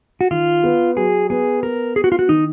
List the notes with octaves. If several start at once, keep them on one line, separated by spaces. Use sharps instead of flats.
F#4
D#3 F4
B3
F#3 G#4
B3 G#4
B3 A#4
B3 G#4
F#4
F4
F#4
D#3 D#4